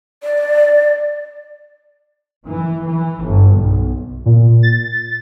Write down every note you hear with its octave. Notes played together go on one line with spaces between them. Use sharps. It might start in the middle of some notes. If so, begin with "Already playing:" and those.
D5
E3
E3
G1
B1
A#2
A6